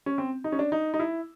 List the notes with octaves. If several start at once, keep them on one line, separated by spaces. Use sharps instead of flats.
C#4
C4
D#4
C#4
D4
D#4
D#4
E4